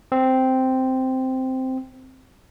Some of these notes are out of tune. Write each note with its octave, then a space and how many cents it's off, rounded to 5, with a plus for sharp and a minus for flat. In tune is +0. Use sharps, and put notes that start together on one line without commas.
C4 -5